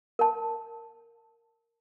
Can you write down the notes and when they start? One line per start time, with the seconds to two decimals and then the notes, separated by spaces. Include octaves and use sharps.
0.19 A#4 A5